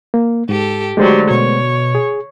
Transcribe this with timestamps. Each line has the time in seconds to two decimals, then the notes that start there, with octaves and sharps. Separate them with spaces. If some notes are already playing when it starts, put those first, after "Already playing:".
0.14 A#3
0.49 G#2 G4 A4
0.97 D3 F#3 G#3 A3 G4 C5
1.30 B2 C#5
1.95 G#4